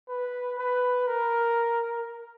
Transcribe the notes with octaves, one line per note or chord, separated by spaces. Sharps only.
B4
B4
A#4